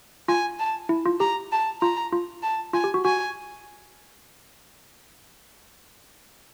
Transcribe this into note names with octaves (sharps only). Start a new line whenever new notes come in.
F4 G#5
A5
E4
F4
G4 A#5
A5
F4 A#5
F4
A5
F4 G#5
G4
F#4
F#4 G#5